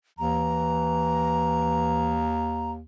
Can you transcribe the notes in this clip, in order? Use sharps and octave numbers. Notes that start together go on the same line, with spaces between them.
D#2 E3 A#5